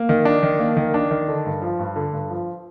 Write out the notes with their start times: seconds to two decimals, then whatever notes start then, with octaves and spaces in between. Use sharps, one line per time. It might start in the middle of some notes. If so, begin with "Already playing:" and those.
Already playing: A#3
0.09 D#3
0.25 D4
0.43 D#3
0.60 A#3
0.77 D#3
0.94 D4
1.11 D#3
1.28 D3
1.46 G2
1.62 F3
1.79 G2
1.96 D3
2.13 G2
2.30 F3